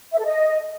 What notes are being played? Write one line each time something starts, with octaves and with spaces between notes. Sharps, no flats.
E5
A4
D#5